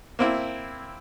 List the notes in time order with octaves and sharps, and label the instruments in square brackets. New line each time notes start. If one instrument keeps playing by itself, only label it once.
[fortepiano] A#3 C4 E4